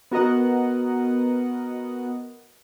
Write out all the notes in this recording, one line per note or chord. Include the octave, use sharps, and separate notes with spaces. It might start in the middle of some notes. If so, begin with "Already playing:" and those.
B3 F#4 A#4 D#5 F#5